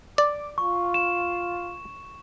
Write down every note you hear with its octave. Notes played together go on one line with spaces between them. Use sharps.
D5 D6
F4 C#6
E7